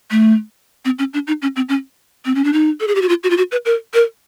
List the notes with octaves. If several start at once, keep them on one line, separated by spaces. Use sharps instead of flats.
A3
C4
C#4
D4
D#4
C#4
C4
C#4
C4
C#4
D4
D#4
A4
G#4
G4
F#4
F4
F#4
F4
F#4
B4
A#4
A#4